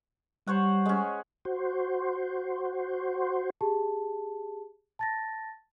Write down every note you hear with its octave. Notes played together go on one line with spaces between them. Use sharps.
G3 C5 C#5 F#5
G#3 C#4
F#4 C5
G4 G#4 A5
A5 A6 A#6